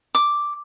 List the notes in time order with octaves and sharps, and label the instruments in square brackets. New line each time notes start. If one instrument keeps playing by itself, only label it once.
[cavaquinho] D6